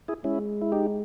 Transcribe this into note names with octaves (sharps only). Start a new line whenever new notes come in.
E4 G#4
G#3 C#4 E4
E4
D#4 G4